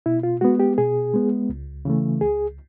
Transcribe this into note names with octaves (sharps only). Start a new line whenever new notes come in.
B2 E4
F4
G#3 B3 F#4
G4
B2 G#4
G#3 B3
C#2
C#3 E3 A3
C#2 G#4